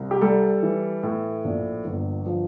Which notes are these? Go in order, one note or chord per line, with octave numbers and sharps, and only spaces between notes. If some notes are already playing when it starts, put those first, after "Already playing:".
Already playing: C2
G4
G3 A4
E3
A2
A#1
G1
F3